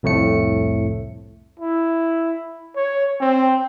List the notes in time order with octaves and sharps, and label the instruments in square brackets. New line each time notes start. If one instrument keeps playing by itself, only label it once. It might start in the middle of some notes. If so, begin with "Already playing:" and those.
[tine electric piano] C2 F2 A2 A3 C#7
[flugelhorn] E4
C#5
C4